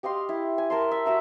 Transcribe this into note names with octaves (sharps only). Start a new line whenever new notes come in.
G4 D#5 F5 C6
E4
G#5
A#4 A5 C6
E5
F#4 E5 A#5